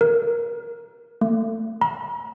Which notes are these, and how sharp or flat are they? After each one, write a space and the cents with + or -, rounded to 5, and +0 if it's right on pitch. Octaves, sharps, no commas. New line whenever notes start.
A#4 +15
A3 +30
A#5 +45